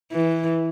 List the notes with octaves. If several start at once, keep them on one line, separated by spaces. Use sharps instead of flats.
E3